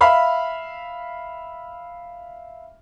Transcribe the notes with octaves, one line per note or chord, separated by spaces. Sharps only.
E5 F5 B5 F6